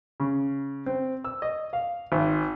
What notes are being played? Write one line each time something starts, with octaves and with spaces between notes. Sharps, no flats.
C#3
C4
E6
D#5
F5
G#1